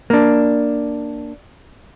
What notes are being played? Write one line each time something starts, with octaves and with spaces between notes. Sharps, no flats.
A#3 D4